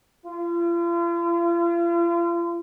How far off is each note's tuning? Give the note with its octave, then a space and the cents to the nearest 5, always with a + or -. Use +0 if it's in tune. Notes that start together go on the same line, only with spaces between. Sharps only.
F4 -40